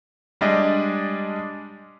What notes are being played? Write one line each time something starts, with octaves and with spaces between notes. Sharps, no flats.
G3 G#3 D4 D#5